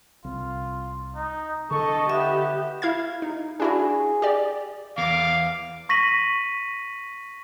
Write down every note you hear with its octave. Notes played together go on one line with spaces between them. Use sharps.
C2 F4
D#4
D3 A4 D#5 C#6
B3 G4 E5
E4 F5 G#6
D#4
D4 E4 F#4 G#4
G4 D5
E2 F5 D6
C#6 A#6 B6 D#7 F#7